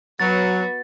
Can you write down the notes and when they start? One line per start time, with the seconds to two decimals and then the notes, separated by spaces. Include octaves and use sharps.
0.20 F#3 B3 F#4 A6